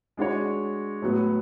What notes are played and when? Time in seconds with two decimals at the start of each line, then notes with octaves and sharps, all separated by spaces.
0.17 G#3 D4 F#4 C#5
1.02 A2 F#3 B3